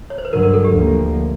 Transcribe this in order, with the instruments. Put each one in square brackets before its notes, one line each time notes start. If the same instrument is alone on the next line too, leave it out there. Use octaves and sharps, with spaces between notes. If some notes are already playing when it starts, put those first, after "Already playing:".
[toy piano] C#5
C5
B4
[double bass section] G2 D3 F#3 [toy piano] A#4
[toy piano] A#4
A4
G4
[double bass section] D2 D3 F3 A#3